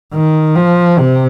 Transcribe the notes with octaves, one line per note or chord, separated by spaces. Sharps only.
D#3
F3
C3